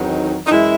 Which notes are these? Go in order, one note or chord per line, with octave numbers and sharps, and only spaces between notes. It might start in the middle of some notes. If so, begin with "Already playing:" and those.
Already playing: E2 D#3 F#3 C4 D#4
D#4
F#2 E3 G#3 E4